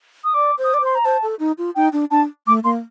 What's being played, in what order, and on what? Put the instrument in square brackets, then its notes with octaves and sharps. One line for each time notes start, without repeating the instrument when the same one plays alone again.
[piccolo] D#6
[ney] D5 [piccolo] D6
[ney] C5
[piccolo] D#6
[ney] D5 [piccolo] D6
[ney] C5 [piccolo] C6
[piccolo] A#5
[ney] C5 [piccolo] A5
[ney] A4
D#4
F4
[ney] D#4 [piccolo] G5
[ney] D4
[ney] D4 [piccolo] A5
[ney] A3 [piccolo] D6
[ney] A#3 [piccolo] C6